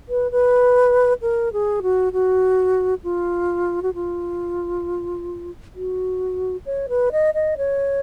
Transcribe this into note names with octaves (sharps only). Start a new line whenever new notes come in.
B4
B4
A#4
G#4
F#4
F#4
F4
F#4
F4
F#4
C#5
B4
D#5
D#5
C#5